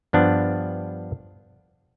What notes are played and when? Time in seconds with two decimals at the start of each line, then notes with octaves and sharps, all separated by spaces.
0.13 G2 F3 B3 D4